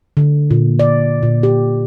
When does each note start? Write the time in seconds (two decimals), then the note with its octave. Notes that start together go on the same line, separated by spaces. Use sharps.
0.17 D3
0.51 A#2
0.79 D5
1.23 A#2
1.43 G4